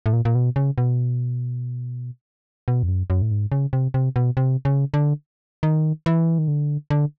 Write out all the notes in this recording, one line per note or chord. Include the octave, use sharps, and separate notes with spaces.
A2
A#2
A#2
B2
C#3
B2
B2
F2
F#2
F#2
A2
G#2
C#3
C3
C3
B2
C3
C#3
D3
D#3
E3
D#3
D3
D3